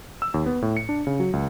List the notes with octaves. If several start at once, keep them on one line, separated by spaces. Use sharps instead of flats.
E6
D#2
B3
A2
C#7
D4
C#3
F#3
C#2